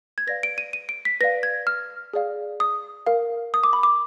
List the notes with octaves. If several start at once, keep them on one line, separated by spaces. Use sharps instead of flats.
G#6
B4 D5 F5 A#6
D7
D#7
D#7
D7
B6
B4 D5 F5 A#6
G#6
F6
G#4 D5 F5
D#6
A#4 F5
D#6
D6
B5
D6